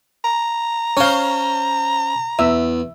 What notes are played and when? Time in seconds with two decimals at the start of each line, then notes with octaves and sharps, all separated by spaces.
0.24 A#5
0.97 C#4 C5 C#5 F5
2.39 E2 E5